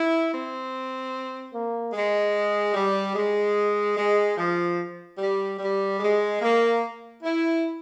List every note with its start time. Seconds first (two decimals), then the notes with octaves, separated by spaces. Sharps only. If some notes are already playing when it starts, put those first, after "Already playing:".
Already playing: E4
0.31 C4
1.53 A#3
1.93 G#3
2.74 G3
3.15 G#3
3.96 G#3
4.37 F3
5.18 G3
5.59 G3
6.00 G#3
6.40 A#3
7.22 E4